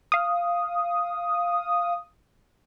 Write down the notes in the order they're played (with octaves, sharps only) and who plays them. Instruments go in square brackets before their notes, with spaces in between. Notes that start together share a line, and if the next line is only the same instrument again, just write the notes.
[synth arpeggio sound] F5 D#6